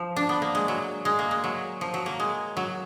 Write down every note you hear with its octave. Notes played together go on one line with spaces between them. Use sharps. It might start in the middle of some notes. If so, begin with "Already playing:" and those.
Already playing: F3
D4
B3
A#3
G#3
F#3
G#3
A#3
G#3
F#3
F3
F#3
A#3
G#3
F#3